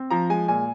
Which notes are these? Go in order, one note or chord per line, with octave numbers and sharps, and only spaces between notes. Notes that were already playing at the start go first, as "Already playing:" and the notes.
Already playing: C4
F3 A#5
G#3 G#5
A#2 G#5